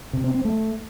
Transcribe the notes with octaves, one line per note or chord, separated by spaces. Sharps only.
C3
C4
C4
A3